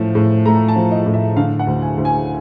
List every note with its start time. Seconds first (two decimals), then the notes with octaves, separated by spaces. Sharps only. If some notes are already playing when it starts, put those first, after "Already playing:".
Already playing: A2 F3
0.15 A2
0.46 A3 A#5
0.69 A5
0.76 F3
0.91 D#5
1.06 A2
1.14 E5
1.36 D3 F5
1.59 F#5
1.67 D2
1.82 G#5
1.97 D2
2.05 G#5